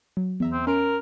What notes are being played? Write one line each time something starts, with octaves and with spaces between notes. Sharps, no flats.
F#3
E2 E5 A#5
C4
C#4 A#4 C6 D7